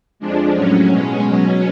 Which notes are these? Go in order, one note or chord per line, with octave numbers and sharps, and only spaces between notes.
F2 F3 G#3 D4
A2 F#3 C#4
B2 G#3
B2 F#3